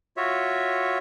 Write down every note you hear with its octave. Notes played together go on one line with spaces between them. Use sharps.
F4 F#4 C#5 E5